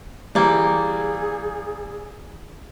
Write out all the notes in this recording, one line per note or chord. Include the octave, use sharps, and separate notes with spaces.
E3 F3 G3 A#3 G#4